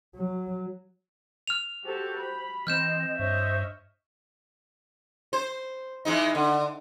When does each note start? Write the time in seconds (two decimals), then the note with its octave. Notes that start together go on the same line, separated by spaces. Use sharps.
0.15 F#3
1.47 F6 F7
1.86 F#4 G4 A4 C5
2.19 B5
2.67 E3 C4 D#5 F6 G6 E7
3.19 G2 C5 C#5 D#5 E5
5.33 C5
6.05 E3 G#3 D#4
6.35 D3